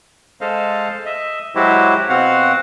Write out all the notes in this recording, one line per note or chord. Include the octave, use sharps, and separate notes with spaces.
G#3 A4 C5 D#5 F5
D#5 E5
F#3 G#3 E4 F#4 G4 C5
B2 C4 F#4 C5 F5 F#5